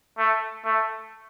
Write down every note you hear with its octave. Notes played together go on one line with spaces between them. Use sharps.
A3
A3